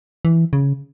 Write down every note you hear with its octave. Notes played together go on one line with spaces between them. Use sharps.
E3
C#3